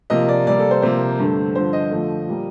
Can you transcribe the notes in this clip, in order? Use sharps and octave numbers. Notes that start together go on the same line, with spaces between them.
C3 F3 A#3 D#5
D5
C3 G3 A#3 D5
A4
C5
C3 F3 A#3 C5
G2 D3 A3
G2 D3 F3 C5
D#5
F2 D3 F3 A3
A#2 G3 A#3